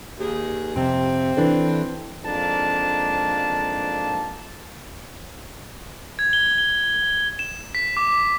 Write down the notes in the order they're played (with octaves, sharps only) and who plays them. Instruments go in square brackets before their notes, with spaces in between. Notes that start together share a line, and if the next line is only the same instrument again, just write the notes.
[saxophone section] D#2 G#4
[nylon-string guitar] F2 C3 [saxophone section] C4
[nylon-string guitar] E3 D4 A4
[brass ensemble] F2 G#2 A#3 D4 A5
[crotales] G#6
G7
G7
E7
B6
D6